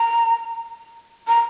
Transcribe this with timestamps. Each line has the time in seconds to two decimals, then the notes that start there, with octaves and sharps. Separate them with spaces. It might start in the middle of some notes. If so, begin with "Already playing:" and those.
Already playing: A#5
1.28 A#5